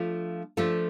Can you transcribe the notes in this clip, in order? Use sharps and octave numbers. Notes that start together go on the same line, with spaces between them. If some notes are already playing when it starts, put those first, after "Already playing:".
Already playing: F3 A3 D4 F4 A4
F3 A3 D4 F4 A4